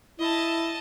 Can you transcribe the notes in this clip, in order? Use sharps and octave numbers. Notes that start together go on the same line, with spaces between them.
E4 D#5 A5